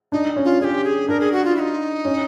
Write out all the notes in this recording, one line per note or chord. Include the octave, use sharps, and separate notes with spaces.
D4 D#4
C#4
F4
C#4 G4 G#4
G#4
D4 A#4
G#4
F#4
F4
E4
D#4
C#4